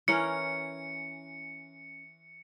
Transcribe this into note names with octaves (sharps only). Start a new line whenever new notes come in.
E3 C#4 A#4 C#7